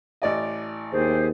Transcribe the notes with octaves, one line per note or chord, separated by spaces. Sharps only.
A1 D5 D#5
D#2 G4 G#4 C5